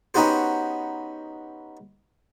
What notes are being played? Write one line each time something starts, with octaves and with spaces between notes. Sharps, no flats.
B3 C#4 D#4 F#4 G4 C5